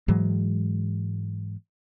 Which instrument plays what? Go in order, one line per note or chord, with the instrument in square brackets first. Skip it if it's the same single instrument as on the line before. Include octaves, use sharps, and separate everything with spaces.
[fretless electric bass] G#2 E3 F#3 G#3